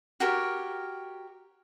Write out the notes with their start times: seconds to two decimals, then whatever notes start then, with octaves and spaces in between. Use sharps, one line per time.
0.20 F#4 G4 A#4 C#5